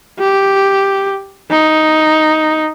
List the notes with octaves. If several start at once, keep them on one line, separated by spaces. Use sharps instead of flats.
G4
D#4